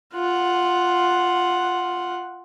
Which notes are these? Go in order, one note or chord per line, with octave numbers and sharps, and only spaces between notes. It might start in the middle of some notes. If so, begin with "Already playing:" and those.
F4 F#5